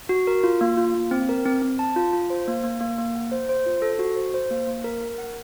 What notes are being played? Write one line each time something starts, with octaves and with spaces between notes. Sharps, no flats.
F#4
A#4
F4
A#3
F4
A#3
C4
A#4
C4
C4
A5
F4
F4
C5
A#3
A#3
A#3
A#3
F#5
C5
C5
F4
A4
F#4
C5
C5
A#3
A#3
A#4
A#4
F#5